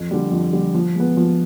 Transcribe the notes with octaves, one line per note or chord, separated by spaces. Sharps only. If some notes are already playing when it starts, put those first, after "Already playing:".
Already playing: F2
D3 G3
F2
D3 G3
F3
G#3 B3
F3